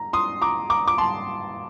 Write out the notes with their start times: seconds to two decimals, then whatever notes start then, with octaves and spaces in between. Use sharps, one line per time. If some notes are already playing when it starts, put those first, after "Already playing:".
Already playing: A#5
0.13 C6 D#6
0.42 A#5 D6
0.70 A#5 D6
0.88 D6
0.98 A5 C6